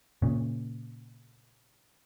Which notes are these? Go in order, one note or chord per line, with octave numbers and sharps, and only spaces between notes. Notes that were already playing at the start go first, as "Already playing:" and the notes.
A#2 C#3